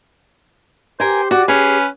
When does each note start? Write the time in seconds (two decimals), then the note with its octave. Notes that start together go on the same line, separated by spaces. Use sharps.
1.00 G4 A#4 C5 G#5
1.31 F#4 D5
1.48 C#4 G#4 B4